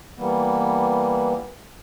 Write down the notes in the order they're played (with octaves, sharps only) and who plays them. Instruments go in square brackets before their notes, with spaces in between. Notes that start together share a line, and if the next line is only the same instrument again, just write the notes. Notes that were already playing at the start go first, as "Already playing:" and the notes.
[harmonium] E3 G3 A#3 B3